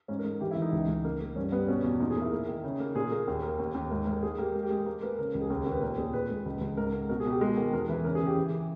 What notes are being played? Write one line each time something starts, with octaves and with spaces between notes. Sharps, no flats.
G#2 C#4
A#4
G#2
E3 G4
E4
E3
D#4
C#2
C#2
A#3
A#3
G2 C#4
G3 B3
B2 C#4
E2
A#2 D#4
G#4
A#3
E4
A#3
D#3
C#3
A#3
A#2 G#4
A#3
D#2
A#3
D#2
D#2
G#2 A#4
G#2 A#4
A#3 G#4
A#3 G4
G#3
G4
G#3 G#4
A#3 A#4
A#3 B4
C#3 A#4
C#2
G#4
D#2 A#4
A#4
D#2
B4
A#2 A#4
A#2 G#4
A#2 B4
G#3
C#2
C#2
G#2 A#4
G#2
B2 A#4
G#4
B2 G4
G#3 A#4
D#3 A#4
E2 A#4
E3 B4
C#3 A#4
G#4
C#3
G4
E3